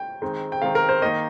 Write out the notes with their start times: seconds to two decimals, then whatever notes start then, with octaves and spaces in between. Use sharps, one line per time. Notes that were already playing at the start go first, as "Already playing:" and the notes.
Already playing: G5
0.22 D#3 G#3 C4 D#4
0.52 G5
0.62 D#3 G#3 C4 D#4 F5
0.75 A#4
0.89 C5
1.02 D#3 A#3 D#4 D#5